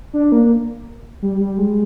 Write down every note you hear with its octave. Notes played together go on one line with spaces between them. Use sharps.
D4
A#3
G3
G3
G#3